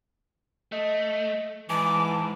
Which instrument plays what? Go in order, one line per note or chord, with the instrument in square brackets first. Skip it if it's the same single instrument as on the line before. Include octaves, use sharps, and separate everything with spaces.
[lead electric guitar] A3 [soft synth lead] D#5
[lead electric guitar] G#2 [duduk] E3 [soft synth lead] A5 [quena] D6